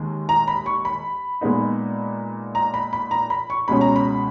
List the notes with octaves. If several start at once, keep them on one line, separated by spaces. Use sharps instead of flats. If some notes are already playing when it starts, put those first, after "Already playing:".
Already playing: D#2 D#3 G#3
A#5
B5
C#6
B5
A#2 G#3 B3 D#4
A#5
B5
B5
A#5
B5
C#6
C#2 B2 G#3 C#4 B5
A#5
B5